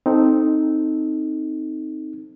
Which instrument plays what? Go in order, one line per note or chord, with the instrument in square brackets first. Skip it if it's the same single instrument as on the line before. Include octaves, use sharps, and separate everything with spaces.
[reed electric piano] C4 D#4 A4